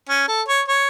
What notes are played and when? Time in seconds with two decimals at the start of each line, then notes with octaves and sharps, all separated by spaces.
0.09 C#4
0.28 A4
0.48 C#5
0.68 C#5